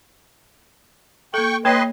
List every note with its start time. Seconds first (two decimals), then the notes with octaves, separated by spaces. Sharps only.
1.34 A#3 A4 G5 C#6
1.65 A#3 B4 C#5 D#5 G5 C6